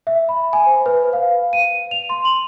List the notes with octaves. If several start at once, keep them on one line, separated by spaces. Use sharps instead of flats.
E5
B5
G#5
C5
B4
F5
D#7
F7
C6
F#7